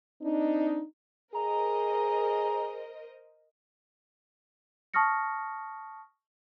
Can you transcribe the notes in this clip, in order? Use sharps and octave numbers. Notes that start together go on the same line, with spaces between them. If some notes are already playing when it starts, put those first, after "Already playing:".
C4 D4 D#4
G#4 A#4 C5 D#5 A#5
A5 C#6 D#6 F6 A#6 C#7